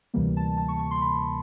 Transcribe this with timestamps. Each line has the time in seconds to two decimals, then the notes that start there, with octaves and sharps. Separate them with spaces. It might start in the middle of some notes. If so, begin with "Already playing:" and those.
0.14 D2 C3 E3 G3 A#3
0.37 A5
0.57 A5
0.68 C#6
0.79 C#6
0.91 C6
1.01 B5